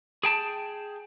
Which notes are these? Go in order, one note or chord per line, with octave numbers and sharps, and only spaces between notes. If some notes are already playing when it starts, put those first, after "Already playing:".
G#4 G5 A5